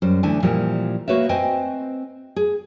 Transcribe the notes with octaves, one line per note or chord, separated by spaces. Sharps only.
F#2 G3 C5
D2 E3 D4 G#5
A#2 E3 F3 G3
A#3 F#4 B4 C#5 E5
C4 B4 C5 D#5 G5 G#5
G#4